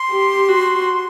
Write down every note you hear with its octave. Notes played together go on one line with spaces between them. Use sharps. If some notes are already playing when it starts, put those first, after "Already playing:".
Already playing: C6
G4
F#4